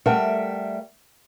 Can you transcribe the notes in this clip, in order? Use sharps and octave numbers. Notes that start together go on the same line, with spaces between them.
G3 A3 A#4 E5 F#5 G5